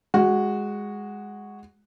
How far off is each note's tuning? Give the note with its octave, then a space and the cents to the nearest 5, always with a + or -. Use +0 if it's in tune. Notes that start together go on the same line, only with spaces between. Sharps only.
G#3 -10 F#4 +0